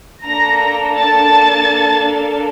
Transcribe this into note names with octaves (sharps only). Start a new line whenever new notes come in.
A#3 D4 A4 A#5 A#6
A5 A6